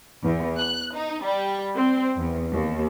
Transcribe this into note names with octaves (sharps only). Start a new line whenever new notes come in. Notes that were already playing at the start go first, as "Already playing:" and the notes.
E2
F#6
D#4
G3
C4
E2
D#2